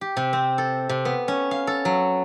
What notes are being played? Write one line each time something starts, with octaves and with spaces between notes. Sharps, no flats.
G4
C3
C4
A4
C3
B3
C#4
F5
A4
F#3